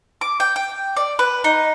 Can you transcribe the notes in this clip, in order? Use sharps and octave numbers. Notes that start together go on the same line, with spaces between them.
D6
G5
G5
D5
B4
D#4